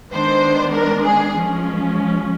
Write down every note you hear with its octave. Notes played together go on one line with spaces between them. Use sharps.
D#3 G#3 B3 D4 C5
A#4
G#4
F3 G#3 C#4